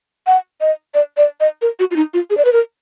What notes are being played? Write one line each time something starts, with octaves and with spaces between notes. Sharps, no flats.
F#5
D#5
D5
D5
D#5
A#4
F#4
F4
D#4
F4
G#4
D5
B4
A#4